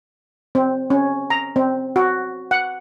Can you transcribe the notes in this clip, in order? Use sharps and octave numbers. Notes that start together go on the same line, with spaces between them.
C4
C#4
A#5
C4
F#4
F#5